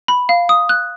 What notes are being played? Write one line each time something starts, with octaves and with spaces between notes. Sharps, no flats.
B5
F5
D#6
F#6